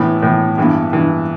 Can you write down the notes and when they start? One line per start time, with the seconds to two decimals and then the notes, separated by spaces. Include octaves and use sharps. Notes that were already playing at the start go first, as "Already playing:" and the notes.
Already playing: A2 E3 B3
0.22 A2 E3 B3
0.58 G2 E3 B3
0.93 G2 E3 B3